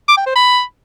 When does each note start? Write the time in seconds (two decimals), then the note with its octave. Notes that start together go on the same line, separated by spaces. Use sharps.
0.08 D6
0.17 G5
0.26 C5
0.36 B5